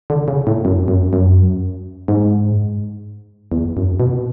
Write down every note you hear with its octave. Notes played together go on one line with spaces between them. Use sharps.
D3
C#3
A2
F#2
F#2
F#2
G#2
E2
F#2
B2